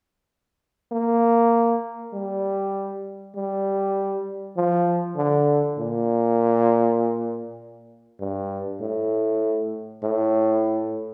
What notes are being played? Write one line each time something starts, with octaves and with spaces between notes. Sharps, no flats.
A#3
G3
G3
F3
D3
A#2
G2
A2
A2